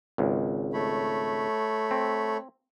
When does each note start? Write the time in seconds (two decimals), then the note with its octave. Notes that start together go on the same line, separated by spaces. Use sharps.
0.18 G#1 C#2
0.73 A3 C#5 B5
1.91 C4